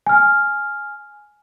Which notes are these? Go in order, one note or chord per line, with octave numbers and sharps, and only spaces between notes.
G#5 F6